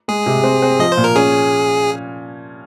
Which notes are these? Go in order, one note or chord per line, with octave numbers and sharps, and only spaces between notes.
G#3 G#4
C3
C4
C4
F3 D#5
C5
A#2
A#4
C#4 G#4